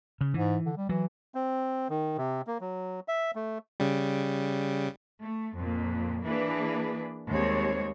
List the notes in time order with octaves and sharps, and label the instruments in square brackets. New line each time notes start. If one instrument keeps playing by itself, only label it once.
[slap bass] C#3
[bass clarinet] G#2 [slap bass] E3
[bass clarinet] D3
G3
[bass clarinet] E3 [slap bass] F#3
[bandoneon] C4
D#3
C3
A#3
F#3
E5
A3
[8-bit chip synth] C#3 G3
[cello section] A3
F2 A#2
E3 A#3 D4 G#4 B4
D#2 G3 G#3 C4 C5 C#5